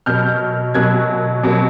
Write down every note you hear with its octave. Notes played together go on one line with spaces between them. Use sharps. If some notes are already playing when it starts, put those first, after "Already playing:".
B2 F#3 A#3 F6 G6
B2 F#3 A#3 F#6 G#6
B2 F#3 A#3